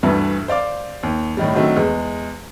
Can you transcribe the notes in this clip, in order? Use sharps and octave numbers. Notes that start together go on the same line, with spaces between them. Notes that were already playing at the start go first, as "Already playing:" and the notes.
D2 G2 E3 A3
C5 D5 F5 D6
D#2
A2 D#3 G3
D3 D#3 F#3 A3 C4
E2 G#3